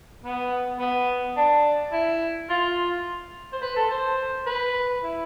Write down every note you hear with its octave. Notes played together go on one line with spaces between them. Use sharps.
B3
B3
D4
E4
F4
C5
B4
A4
C5
B4
E4